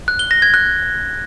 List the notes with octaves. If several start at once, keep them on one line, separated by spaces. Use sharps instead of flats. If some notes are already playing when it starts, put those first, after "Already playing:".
F#6
G7
A#6
G#6
F#6